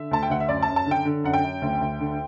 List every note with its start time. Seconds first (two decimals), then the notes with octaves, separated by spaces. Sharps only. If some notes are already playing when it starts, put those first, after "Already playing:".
Already playing: D3 E5
0.11 D2 A5
0.23 G5
0.30 D2 F#5
0.40 E5
0.49 F#2 D5
0.62 F#2 A5
0.76 A5
0.86 D3
0.91 G5
1.05 D3
1.24 F#2 F#5
1.34 G5
1.43 F#2
1.62 D2
1.81 D2
2.00 D3